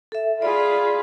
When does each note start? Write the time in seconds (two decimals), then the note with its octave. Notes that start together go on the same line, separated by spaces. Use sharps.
0.12 A4 E5
0.42 F4 G#4 D5 B5